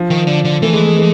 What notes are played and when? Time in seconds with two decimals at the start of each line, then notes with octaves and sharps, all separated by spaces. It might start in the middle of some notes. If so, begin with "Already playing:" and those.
Already playing: F3
0.10 D#3
0.27 D3
0.44 D3
0.62 E3 A3
0.73 G#3
0.86 G#3
0.96 G#3